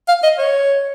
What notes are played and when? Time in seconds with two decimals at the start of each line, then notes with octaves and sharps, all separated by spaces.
0.08 F5
0.23 D#5
0.38 C#5